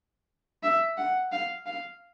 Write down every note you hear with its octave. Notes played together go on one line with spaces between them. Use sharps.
E5
F#5
F5
F5